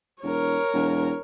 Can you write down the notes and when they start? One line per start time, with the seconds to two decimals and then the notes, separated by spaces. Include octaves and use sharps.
0.23 E1 A#4 C#5
0.73 E1